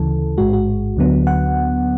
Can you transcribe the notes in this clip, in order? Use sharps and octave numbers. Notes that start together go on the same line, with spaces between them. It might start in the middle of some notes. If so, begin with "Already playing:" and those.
Already playing: D2 C#3 E3 A4
A1 G#2 G#3 F#4
F#4
D2 D3 F#3 B3
F#5